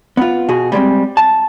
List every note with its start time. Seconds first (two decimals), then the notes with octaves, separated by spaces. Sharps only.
0.17 B3 F4
0.49 B2 F#4 G#4
0.72 G3 G#3 A#3 C4
1.17 A5